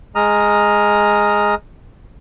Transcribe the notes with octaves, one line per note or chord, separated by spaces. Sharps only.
G#3 A#5 D#6 F6